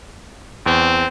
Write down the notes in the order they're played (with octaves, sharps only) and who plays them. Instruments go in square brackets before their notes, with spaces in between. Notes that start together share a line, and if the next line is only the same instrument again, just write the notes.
[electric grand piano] E2 [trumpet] C4